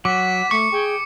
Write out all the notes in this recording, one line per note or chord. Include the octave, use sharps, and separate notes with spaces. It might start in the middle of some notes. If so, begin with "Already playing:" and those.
F#3 F#5 D6 B6
A3 C#6 C#7
G#4 G5